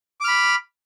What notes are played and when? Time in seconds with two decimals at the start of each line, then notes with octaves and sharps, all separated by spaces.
0.21 D6
0.24 F6
0.28 B5